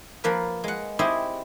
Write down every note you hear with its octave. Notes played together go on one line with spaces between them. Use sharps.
F3 A#3 B4
G#3 F#5
C4 E4 G4 G#4 C5 D#5